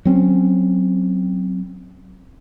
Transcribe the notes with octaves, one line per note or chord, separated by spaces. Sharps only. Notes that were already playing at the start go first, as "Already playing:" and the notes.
F#3 C4 C#4